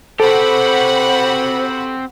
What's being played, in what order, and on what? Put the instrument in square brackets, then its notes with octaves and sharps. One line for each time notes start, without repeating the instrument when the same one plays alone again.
[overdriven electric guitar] C4 G4 [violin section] F#4 F#5 B5 [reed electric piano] A4 [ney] C5